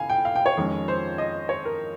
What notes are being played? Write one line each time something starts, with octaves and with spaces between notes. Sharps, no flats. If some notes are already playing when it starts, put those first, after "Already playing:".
Already playing: C#3 F5 G#5
G5
F5
G5
C#5
F2 D#3 G#3 C#4
C5
D#5
C#5
A#4